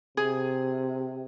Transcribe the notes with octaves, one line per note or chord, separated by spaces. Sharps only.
C3 G#4